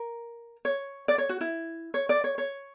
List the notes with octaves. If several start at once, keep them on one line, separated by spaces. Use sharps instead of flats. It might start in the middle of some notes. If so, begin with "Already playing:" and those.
Already playing: A#4
C#5
D5
C#5
F#4
E4
C#5
D5
C#5
C#5